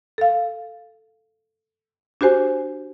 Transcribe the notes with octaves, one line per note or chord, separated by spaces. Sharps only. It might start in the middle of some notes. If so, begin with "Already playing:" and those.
A4 F5
D4 F#4 G4 C5 G#5